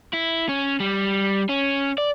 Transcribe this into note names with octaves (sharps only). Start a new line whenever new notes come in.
E4
C#4
G3
C#4
D5